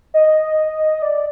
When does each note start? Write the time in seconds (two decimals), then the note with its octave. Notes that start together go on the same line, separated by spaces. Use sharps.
0.14 D#5
1.02 D5